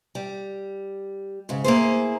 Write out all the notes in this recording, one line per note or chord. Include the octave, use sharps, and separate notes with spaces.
G3
G#2 C#3
A#3 E4 G#4 C5